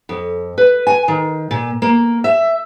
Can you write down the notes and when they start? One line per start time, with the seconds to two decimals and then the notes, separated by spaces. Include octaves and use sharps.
0.09 F2
0.58 B4
0.87 G#5
1.08 D#3
1.51 A#2
1.82 A#3
2.24 E5